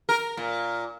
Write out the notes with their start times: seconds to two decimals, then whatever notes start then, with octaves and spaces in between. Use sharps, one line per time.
0.09 A#4
0.37 A#2